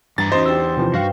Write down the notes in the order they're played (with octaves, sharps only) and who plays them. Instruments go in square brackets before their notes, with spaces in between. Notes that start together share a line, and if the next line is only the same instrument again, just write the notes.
[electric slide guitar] E2 A#5 [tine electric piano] G2 [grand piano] A6
[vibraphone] C#4 F#4 [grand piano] D#4 C5 [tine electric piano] D#5
[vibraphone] D4 G4 G5 [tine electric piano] E6
[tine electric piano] C3 E3 F3
[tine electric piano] G2 F5 [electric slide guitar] F#4 [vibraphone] B4 G5